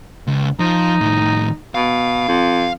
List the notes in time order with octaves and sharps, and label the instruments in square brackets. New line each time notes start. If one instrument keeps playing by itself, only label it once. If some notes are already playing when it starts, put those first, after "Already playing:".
[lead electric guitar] C#2
[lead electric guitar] F3 [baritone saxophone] D#4
[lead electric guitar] A2 D#3
[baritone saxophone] B2 [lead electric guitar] F5
[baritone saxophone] F2